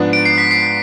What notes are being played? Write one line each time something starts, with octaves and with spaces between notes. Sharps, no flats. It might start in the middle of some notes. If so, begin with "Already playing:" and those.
Already playing: G#2 F3 B3 D4
D7
C7
B6
C7